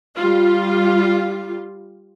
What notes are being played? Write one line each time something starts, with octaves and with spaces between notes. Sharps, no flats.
G3 F4